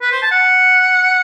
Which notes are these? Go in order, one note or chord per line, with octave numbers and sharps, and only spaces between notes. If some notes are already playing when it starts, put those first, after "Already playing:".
B4
C5
A5
F#5